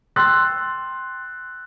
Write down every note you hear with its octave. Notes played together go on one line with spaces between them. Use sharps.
G5 C6 E6 F#6 A6